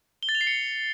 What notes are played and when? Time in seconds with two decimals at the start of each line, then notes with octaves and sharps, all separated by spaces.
0.23 G7
0.29 A6
0.35 F7
0.41 C7
0.47 C#7